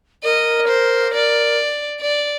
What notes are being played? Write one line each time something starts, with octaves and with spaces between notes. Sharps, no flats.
A#4 D#5
C5
D5
D5